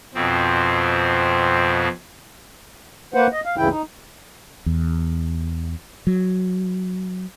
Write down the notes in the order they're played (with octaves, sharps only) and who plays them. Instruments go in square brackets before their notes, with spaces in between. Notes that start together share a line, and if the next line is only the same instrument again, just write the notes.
[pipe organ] F2 B2 C4
[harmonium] A#3 B4 C5 F#5
D#5
F5
D2 G2 C#3 E3 E4 G5
D#4
[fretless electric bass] E2
F#3